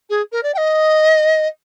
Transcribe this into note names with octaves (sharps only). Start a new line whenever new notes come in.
G#4
A#4
D5
G5
D#5